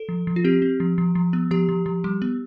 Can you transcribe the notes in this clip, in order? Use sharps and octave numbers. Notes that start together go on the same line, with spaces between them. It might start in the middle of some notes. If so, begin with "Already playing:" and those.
Already playing: A4
F3
F3
F4
C4 G4
C4
F3
F3
F3
B3
F3 G4
F3
F3
G3
B3